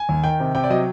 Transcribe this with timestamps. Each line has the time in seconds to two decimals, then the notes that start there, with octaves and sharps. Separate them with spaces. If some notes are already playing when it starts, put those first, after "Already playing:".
Already playing: G#5
0.09 D#2
0.24 D#3 G5
0.40 C3
0.55 C3 G5
0.64 D5
0.70 F#3 D#5